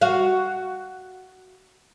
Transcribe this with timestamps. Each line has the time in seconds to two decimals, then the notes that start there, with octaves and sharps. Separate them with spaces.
0.01 F#4 F5